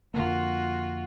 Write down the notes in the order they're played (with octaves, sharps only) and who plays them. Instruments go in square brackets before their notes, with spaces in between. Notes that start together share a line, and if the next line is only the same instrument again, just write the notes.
[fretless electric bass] F2 D3 A#3 [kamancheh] F4 F#4